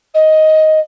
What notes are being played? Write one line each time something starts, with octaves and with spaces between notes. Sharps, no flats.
D#5